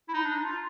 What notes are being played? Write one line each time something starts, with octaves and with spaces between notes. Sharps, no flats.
E4
D#4
D4
D#4
F4